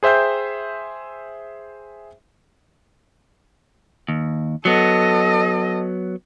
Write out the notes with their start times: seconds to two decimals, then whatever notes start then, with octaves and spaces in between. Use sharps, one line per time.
0.03 G#4 C5 E5 G5 G6
4.08 D#2
4.65 F#3 B3 A4 D#5